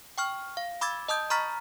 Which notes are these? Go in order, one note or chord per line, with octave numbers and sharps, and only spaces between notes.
G5 C#6 F6
F5
B5 D6 E6 G#6 A6
D#5 A5 D#6 G6
A#5 B5 C#6 F6 A6 B6